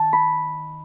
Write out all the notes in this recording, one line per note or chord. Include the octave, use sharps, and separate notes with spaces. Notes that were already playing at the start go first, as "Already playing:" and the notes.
Already playing: D#3 A5
B5